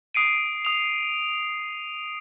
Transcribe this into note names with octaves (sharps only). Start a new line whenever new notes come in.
D#6 C7 D7 D#7
D#6 F7